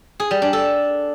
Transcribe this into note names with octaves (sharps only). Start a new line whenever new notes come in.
G#4
G3
D4
A4